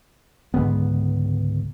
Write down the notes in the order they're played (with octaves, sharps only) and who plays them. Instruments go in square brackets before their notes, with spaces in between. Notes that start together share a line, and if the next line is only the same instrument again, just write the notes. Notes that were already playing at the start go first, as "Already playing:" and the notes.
[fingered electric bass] C#2 G#2 D3 B3